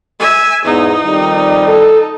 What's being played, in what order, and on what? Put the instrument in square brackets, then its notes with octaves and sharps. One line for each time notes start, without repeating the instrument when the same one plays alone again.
[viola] E5 G#5
[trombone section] E2 G#2 [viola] D#4
[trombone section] F2 D#3 G3
[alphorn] A4